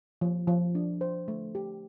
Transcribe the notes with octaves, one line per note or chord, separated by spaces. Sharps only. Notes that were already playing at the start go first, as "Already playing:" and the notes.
F3
F3
D4
C5
A3
G4